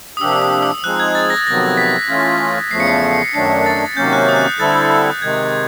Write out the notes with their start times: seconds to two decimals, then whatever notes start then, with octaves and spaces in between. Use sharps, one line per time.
0.17 D#6
0.21 C3 F3 A#3 D4 G4 E6
0.32 E6
0.42 D#6
0.63 E6
0.83 F3 G#3 C4 D#4 G#4 F#6
1.00 G#6
1.15 A6
1.30 A#6
1.47 F2 C3 D#3 F#3 B3 A#6
1.77 B6
2.08 E3 A3 C#4 F4
2.71 E2 C#3 F3 A3 C7
2.80 C#7
2.87 C7
3.34 F#2 D#3 F#3 A3 D4 C7
3.66 A6
3.96 C3 D#3 F#3 A#3 C#4 G6
4.13 F#6
4.28 D#6
4.36 F#6
4.44 G6
4.59 D3 G3 C4 E4 A4 A6
4.91 A6
5.22 C3 D#3 G#3 G#6